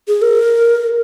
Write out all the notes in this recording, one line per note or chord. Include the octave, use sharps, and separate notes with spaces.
G#4
A#4